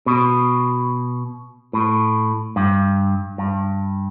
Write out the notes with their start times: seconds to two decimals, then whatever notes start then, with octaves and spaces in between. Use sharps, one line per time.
0.06 B2
1.73 A2
2.56 G2
3.38 G2